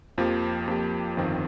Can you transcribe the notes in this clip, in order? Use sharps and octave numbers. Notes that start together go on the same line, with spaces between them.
F2 F3 A#3 G4
F2 F3 A#3 G4
G1 F2 D#3 C4 F4